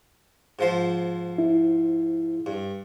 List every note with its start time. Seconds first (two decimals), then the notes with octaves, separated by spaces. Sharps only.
0.59 G#2 F3 C5
1.38 E4
2.46 G2